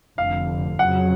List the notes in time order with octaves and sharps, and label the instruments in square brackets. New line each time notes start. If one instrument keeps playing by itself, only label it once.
[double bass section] F1 F2 D3 [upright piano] F5
[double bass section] F2 C#3 F#3 [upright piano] F#5